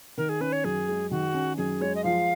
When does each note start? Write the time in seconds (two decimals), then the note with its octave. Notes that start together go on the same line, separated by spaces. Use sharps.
0.18 D#3 A#4
0.29 G#4
0.41 C#4 B4
0.52 C#5
0.65 F#2 G#4
0.88 G#3
1.11 D#3 F#4
1.34 C#4
1.58 F#2 G#4
1.81 G#3 C#5
1.95 D#5
2.04 F3 F5